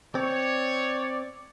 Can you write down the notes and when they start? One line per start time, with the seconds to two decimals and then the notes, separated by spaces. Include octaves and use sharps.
0.15 C4 C#5 D5